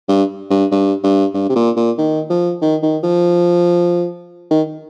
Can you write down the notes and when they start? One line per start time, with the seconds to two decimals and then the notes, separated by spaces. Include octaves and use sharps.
0.09 G2
0.50 G2
0.71 G2
1.03 G2
1.34 G2
1.49 C3
1.55 A#2
1.76 A#2
1.98 D#3
2.30 F3
2.61 D#3
2.83 D#3
3.03 F3
4.51 D#3